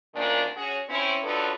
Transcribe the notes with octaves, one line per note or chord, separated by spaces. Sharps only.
D2 A#2 D#3 A#3 C#4 D4
C#4 F#4 G#4 C#5
C4 C#4 E4
F#2 F3 F#3 D4 A4 B4